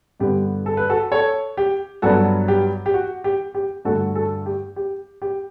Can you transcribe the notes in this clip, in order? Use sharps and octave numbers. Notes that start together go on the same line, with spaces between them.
G2 D3 G3 B3 G4
A4
B4
F#4 A4
A4 C#5
G4
G2 F#3 B3 D4 F#4 A4
G4
G4
F#4
G4
G4
G2 D3 A3 F#4 A4
F#4 A4
G4
G4
G4